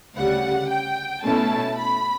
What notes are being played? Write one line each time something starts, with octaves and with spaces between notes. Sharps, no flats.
D2 C#3 G3 F#5
G5
B2 A3 C#4 E4 A5
B5